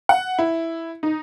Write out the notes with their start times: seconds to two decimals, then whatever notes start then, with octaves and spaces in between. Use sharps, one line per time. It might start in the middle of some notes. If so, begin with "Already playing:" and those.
0.09 F#5
0.39 E4
1.03 D#4